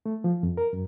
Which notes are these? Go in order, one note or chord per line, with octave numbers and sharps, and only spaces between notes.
A3
F3
F2
A#4
F#2